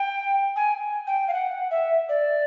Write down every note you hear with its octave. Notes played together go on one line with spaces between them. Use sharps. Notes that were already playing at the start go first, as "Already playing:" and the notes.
Already playing: G5
G#5
G5
F5
F#5
E5
D5